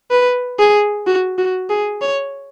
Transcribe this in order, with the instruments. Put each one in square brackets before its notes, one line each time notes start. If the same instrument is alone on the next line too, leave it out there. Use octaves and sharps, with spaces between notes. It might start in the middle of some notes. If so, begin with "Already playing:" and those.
[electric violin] B4
G#4
F#4
F#4
G#4
C#5